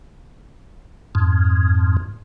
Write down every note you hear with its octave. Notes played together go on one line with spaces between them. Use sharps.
F2 G#2